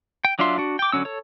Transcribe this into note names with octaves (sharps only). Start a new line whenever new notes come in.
G5
F#3 D4 F4 E5 C6
D4 F#4
G5 D6
D3 F#3 C#4 E6
A4 C#5